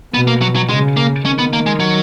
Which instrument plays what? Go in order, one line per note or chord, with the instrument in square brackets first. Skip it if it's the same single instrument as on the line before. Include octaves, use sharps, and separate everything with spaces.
[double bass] B2 [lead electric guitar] B3
[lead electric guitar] A#3
F#3
F#3
[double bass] C#3 [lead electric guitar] G#3
[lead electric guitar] A#3
[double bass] D#3 [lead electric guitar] C#4
[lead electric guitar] B3
A#3
G#3
F#3